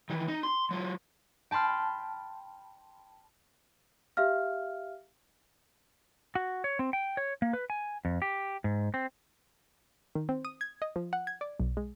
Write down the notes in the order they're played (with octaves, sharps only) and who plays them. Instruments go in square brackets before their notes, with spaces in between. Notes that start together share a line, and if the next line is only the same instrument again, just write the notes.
[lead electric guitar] D#3 E3
D#4
C6
F#3 F4
[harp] G5 A5 B5 C6 F6
[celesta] G4 E5 F5 F6
[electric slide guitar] F#4
C#5
C4
G5
C#5
A#3
B4
G#5
F2
G4
G#2
C4
[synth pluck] D#3
C4
D#6
G#6
D#5
F3
F#5
G#6
D5
B1
G#3